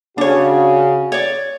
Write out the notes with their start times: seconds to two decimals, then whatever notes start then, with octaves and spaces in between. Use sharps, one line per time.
0.18 C#3 D4 F#4 C#5
1.12 C#5 D5